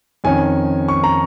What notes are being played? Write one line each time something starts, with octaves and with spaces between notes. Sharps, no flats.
F2 D#3 C#4 G#5
C#6
A#5